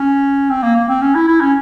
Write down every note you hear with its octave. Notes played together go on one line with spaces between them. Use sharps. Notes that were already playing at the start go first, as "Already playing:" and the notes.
Already playing: C#4
C4
A#3
A#3
C4
C#4
E4
E4
C#4